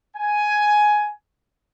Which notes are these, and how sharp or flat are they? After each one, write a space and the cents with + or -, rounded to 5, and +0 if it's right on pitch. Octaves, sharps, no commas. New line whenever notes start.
G#5 +10